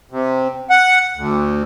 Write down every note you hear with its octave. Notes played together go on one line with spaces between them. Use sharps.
C3
F#5
D2